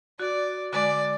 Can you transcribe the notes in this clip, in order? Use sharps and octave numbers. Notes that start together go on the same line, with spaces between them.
F#4 D5
D3 G#3 D5